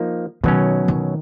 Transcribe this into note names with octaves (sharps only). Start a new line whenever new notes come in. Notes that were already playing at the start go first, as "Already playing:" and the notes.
Already playing: F3 A#3 D#4
B2 D#3 F#3 C#4
D#3